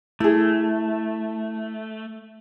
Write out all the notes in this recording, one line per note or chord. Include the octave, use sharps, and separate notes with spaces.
A3 E4 G#4